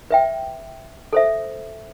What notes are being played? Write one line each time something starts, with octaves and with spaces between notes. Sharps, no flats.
B4 E5 G5
A4 C5 E5